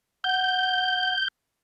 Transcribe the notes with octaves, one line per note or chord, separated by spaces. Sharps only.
F#5 G6